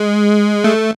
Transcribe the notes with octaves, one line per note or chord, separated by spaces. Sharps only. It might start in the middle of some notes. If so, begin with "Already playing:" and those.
Already playing: G#3
A3